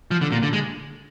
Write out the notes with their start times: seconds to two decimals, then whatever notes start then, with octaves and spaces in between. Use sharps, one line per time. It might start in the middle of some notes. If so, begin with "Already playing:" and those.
0.11 F3
0.21 D3
0.32 A#2
0.43 D3
0.53 G#3